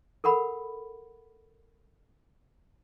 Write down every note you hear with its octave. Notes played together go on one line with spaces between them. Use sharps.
A4 A#4 F#5 B5